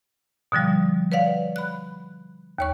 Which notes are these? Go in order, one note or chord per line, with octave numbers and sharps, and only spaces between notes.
B2 D3 F3 G3
B4 C#5 D5 F5 F#5
B5 F#6
D#2 C#5 C#6